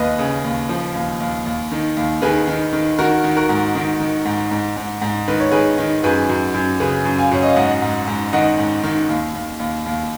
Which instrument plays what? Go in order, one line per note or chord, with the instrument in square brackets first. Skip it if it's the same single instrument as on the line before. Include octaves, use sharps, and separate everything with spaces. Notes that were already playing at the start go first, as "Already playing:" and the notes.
Already playing: [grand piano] D#2 B4 D#5
C#3
D#2
F3
D#2
D#2
D#2
D#3
D#2
D#3 G#4 B4
D#3
D#3
D#3 F#4 A#4
D#3
F#4 A#4
G#2
D#3
D#3
G#2
G#2
G#2
G#2
D#3 B4
C#5
D#3 G#4 B4
D#3
F#2 G#4 B4
F#2
F#2
C#3 G#4 B4
F#2
F5 G#5
F#2 C#5
D#5
F5
G#2 D#5 F#5
G#2
G#2
D#3 D#5 F#5
G#2
D#3
D#2
D#2
D#2
D#2